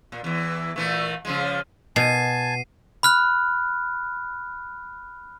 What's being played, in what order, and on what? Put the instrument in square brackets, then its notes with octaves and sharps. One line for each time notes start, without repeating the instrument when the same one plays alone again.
[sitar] A#2
E2 E3
A#2 E3 A3
C#3 F3 G#3
[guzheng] B2 [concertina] G#5 A5 [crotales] C7 D#7
[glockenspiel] B5 F6 F#6